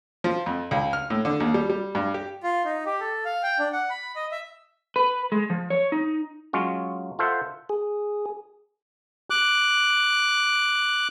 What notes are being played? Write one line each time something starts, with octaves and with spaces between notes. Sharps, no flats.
F3
F2
C#2
F6
A2
D3
D#2
G3
G3
G2
G4
F4
D#4
G4
A4
F5
G5
D4
F#5
B5
D#5
E5
B4
G#3
F3
C#5
D#4
F#3 G#3 C#4 F4
F4 A4 C5 E5 F#5
G#4
D6 F#6